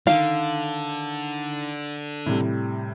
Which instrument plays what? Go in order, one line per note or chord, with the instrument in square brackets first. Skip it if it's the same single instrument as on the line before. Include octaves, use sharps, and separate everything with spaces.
[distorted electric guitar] D3 [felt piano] D#3 [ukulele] F5
[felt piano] A2 C3 G3